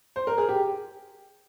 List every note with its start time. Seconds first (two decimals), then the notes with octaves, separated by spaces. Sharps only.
0.16 C5
0.27 A#4
0.38 G#4
0.49 G4